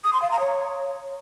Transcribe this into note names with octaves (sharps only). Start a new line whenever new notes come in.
D#6
C6
F5
A#5
C#5